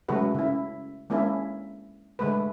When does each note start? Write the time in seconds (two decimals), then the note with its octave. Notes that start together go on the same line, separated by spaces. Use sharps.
0.08 C#3 F#3 G#3 A3 F#4 B4
0.35 C#3 E4
1.10 G#3 A#3 C#4 D4 E4
2.19 D3 G#3 A3 B4